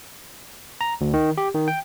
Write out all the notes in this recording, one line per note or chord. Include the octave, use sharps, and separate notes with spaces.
A#5
D2
D#3
G4
D#3
G5